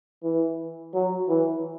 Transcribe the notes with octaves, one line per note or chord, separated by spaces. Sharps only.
E3
F#3
E3